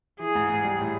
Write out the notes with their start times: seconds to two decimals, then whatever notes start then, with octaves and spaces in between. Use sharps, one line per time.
0.19 E3 G#4
0.35 G#2
0.50 G#2
0.63 G3
0.79 A2